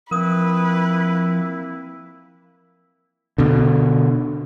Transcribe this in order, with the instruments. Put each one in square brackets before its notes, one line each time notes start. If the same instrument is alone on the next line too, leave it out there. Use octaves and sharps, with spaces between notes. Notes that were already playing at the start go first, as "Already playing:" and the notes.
[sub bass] F3 [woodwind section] A#3 C4 E4 [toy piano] A#4 D#6 [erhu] B4
[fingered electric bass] B2 D3